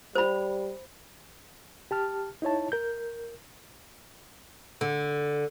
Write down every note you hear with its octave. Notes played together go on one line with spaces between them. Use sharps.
G3 C5 B5
G4 A5 F6
D#4 E4 C#5 A5
A#4 G6
D3